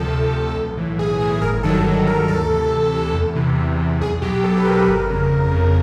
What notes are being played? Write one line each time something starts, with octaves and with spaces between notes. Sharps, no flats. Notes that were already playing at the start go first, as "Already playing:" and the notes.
Already playing: D2 C3 F3 A4
D2
C3 F3
B1
A2 E3
B1 G#4
A2 E3 G#4
G1 A#4
G2 D#3 F#3 A4
G1 A4
G2 D#3 F#3 A#4
D2 A4
C3 E3
D2
C3 E3
E2
C3 E3
E2
C3 E3
B1 G#4
B2 F#3 G4
B1 A4
B4
B2 F#3 A#4
G1
F2 C#3
G1
F2 C#3